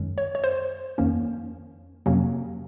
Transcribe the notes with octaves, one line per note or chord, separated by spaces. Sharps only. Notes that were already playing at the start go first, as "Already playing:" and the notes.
Already playing: F#2 D#3 G#3 C#4
C#5
C#5
C5
F2 D#3 A#3 C#4
F2 C3 F#3 A#3 C#4